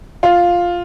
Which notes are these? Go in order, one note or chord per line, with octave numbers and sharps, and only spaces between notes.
F4